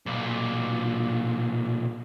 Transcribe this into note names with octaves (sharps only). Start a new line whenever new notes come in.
B1 A#2